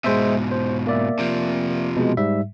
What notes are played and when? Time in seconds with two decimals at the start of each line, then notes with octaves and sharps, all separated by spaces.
0.04 G#2 B2 G#3 C5 E5
0.52 C5
0.87 A#3 D5 E5
1.19 C3 F3
1.96 B2 G#3
2.17 G#2 G3 E5